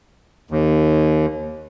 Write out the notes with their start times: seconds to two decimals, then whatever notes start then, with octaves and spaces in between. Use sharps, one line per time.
0.51 D#2